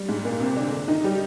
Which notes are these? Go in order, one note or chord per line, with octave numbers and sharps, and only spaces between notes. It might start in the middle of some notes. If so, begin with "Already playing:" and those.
Already playing: G3
G#2 G#3
A#2 A#3
C3 C4
D3 D4
D3 D4
D#3 D#4
G3 G4